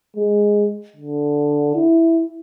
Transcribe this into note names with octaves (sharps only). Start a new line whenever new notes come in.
G#3
D3
E4